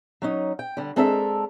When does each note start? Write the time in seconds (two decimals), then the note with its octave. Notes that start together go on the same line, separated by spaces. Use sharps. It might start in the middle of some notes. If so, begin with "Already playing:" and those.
0.22 F#3 C#4 D#4
0.59 G5
0.77 D3 G3
0.96 G#3 C4 D4 A4 A#4 E5